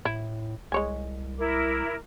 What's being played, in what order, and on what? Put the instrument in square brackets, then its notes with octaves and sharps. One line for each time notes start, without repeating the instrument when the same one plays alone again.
[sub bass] A2 [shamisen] E4
[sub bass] C2 [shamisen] G#3 C#5 G#5
[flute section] E4 A#4 D6